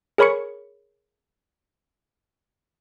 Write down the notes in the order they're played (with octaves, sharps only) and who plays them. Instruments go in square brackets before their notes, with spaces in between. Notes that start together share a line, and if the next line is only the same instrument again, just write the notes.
[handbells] G#4 A#4 C#5 B5 C#6 C#7